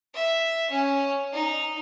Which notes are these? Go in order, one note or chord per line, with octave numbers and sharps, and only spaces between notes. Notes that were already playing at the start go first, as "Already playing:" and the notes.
E5
C#4
D#4